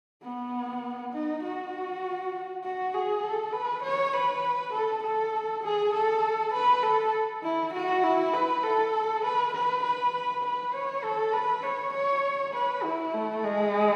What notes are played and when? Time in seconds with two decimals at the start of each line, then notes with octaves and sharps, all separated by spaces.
0.23 B3
1.13 D#4
1.43 F#4
2.64 F#4
2.94 G#4
3.24 A4
3.53 B4
3.83 C#5
4.14 B4
4.74 A4
5.03 A4
5.64 G#4
5.94 A4
6.53 B4
6.83 A4
7.43 E4
7.73 F#4
8.03 E4
8.33 B4
8.64 A4
9.24 B4
9.54 B4
9.83 B4
10.44 B4
10.73 C#5
11.03 A4
11.33 B4
11.63 C#5
11.94 C#5
12.54 B4
12.83 E4
13.14 A3
13.44 G#3